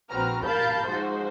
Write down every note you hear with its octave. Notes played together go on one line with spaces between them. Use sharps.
A#1 C4 F#4 B4 A#5 F6
A#4 F5 A5 B5 G6 A6
G#2 F3 F#4 C5